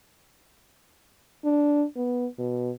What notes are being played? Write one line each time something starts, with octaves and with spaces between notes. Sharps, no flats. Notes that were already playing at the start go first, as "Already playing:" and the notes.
D4
B3
B2